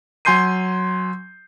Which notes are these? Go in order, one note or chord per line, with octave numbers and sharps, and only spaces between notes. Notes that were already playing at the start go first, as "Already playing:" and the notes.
F#3 G#5 C6 G6 C7 D#7